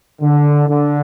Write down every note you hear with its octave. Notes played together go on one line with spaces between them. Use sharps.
D3
D3